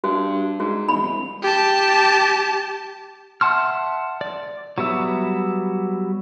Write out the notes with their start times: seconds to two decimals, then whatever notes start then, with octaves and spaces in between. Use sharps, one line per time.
0.04 G2 F#4
0.60 G#2 F#4
0.88 E1 B5
1.02 C2
1.43 G4 A5
3.41 E5 F#5 A5 C6 F6
4.21 D5
4.78 F#3 G3 B3 E5